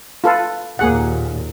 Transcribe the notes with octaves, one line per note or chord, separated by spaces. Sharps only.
F4 A4 B4
D#2 A#2 A#3 G#4 F#5